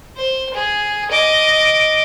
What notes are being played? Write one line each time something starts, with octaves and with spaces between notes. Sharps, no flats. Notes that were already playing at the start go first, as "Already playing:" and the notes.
C5
G#4
D#5 D6